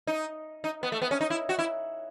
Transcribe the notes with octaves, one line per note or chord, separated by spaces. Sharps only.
D#4
D#4
B3
A3
B3
C#4
D#4
E4
F#4
E4